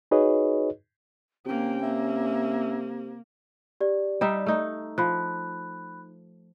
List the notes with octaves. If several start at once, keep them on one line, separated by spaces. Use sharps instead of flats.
D#4 F#4 G#4 B4 C#5 D#5
C3 A#3 C#4 G5
A#3 E5
G4 D5
G3 D#4 E5
A3 D#4
F3 B5 F#6